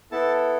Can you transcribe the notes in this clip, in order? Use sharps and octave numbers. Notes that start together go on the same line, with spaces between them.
B3 E4 A4 A5